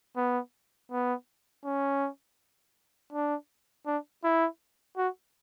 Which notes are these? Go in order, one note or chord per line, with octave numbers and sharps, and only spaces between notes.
B3
B3
C#4
D4
D4
E4
F#4